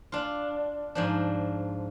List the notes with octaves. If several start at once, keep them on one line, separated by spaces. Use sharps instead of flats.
D4 F4
G#2 F3 D4